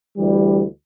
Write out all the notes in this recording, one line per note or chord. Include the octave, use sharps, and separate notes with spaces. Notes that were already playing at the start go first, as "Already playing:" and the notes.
D2 E3 G3